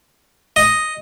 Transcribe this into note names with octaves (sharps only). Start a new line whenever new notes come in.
D#5